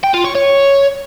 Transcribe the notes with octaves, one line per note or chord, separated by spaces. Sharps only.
G5
F4
C#5
C#5